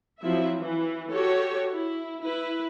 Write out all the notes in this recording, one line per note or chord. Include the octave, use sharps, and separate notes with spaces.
F3 F#3 C4 E4 E5
E3
F#4 G4 A4 C#5
E4
E4 B4